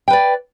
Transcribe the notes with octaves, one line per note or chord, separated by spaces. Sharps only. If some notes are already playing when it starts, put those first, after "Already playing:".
B4 D5 G5